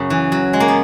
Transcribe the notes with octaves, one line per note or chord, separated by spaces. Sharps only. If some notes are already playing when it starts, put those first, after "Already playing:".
Already playing: F#2 C#3
E3
F#3
G#3
A#3
B3